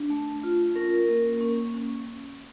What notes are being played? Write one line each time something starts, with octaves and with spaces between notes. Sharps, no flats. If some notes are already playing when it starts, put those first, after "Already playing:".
Already playing: D4
A3
F4
C#4 A#4
A#3
C#4
C#4